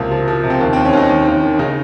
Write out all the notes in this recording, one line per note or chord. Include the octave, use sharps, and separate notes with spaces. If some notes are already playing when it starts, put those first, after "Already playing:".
Already playing: C#2 C3 F3 A#3
F3
F3
C3
C4
D#2 A#3
C4
D#2
C#4
D#2 D#4
D#2
D#2
D#3
C#3 D#4